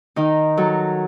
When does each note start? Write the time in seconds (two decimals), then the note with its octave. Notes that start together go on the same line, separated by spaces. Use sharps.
0.16 D#3 D#4
0.57 F#3 A4